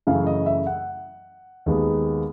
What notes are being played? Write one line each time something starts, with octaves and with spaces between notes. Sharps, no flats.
F#2 C#3 E3 A3 F5
D#5
E5
F#5
D#2 D#3 G#3 B3